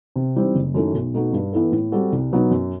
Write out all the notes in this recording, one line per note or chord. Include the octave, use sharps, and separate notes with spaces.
C3
E3 G3 C4 D#4
F#1
F#2 D#3 A3 E4
B1
B2 A3 D#4 F#4
G2
E3 B3 E4 A4
A2
G3 C4 F#4 A4
C2
B2 F#3 B3 D#4
F#2